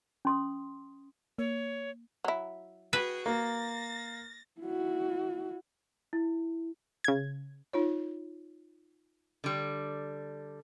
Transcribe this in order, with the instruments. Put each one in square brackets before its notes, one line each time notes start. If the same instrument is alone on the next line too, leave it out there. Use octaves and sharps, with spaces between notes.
[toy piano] C#4 C6 D#6
[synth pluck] A#3 [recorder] C#5
[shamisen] F#3 E4
[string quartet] F#4 G#4 G5 [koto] B4
[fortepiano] A#3 [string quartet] A6 A#6
[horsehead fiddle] E4 F#4
[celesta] E4
[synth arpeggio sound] C#3 G#6
[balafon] D#4 F4 C#5
[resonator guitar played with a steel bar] D3 G3